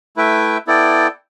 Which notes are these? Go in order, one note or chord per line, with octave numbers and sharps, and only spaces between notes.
A3 E4 B4 E5 G5
B3 E4 A4 D5 G5